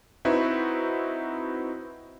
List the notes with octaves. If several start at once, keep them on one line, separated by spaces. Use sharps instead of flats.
C4 D#4 E4 F#4 B4